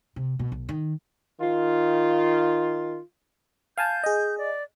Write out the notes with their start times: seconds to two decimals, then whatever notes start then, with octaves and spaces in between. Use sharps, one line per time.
0.16 C3
0.39 B2
0.52 B1
0.69 D#3
1.41 D#3 F4
3.78 F5 G#5 A5 G6
4.04 G#4 D#5
4.38 D5